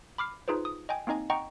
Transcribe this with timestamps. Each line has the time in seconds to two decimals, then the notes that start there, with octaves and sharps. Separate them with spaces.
0.18 B5 D6 F6 C7
0.48 D#4 F4 G#4 B4 C5
0.65 D#6
0.89 D#5 G5 G#5
1.07 A#3 C4 D#4 D#5 G#5
1.30 D#5 F#5 G5 A#5 C#6